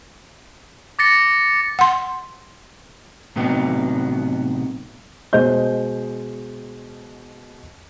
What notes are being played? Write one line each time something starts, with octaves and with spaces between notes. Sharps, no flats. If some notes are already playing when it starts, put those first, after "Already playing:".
D6 A6 A#6 C#7
F#5 C6
A2 C3 F#3 B3 D#4
B2 G#3 C5 D#5 G6